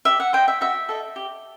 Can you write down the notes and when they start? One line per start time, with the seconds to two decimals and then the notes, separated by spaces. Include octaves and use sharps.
0.05 G4 E5
0.20 F#5
0.33 C5 D#5 G5
0.48 E5
0.61 F#4 E5
0.89 A4 D#5
1.16 G4